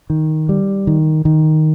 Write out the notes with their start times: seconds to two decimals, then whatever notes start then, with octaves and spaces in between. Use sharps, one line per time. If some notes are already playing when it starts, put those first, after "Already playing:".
0.10 D#3
0.49 G3
0.87 D#3
1.25 D#3